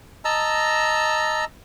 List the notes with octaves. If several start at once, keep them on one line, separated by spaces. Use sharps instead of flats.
D#5 A5 A#5 E6